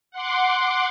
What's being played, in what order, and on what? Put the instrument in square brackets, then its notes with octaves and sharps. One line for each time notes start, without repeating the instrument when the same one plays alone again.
[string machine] F#5 C6 D6